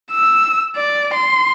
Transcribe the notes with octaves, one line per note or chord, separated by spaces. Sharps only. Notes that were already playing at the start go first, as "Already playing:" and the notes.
E6
D5
C6